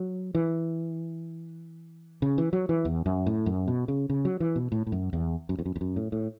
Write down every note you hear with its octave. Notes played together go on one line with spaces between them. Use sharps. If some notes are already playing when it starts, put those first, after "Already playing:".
Already playing: F#3
E3
C#3
E3
F#3
E3
E2
F#2
A2
F#2
B2
C#3
C#3
F#3
E3
B2
A2
A2
F#2
E2
F#2
E2
F#2
E2
F#2
A2
A2